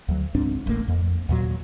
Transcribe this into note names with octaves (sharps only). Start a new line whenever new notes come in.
D2 F#3
C#2 G#2 C4 D4
D1 A1 A2 A#3
F2
D#2 A#2 F#3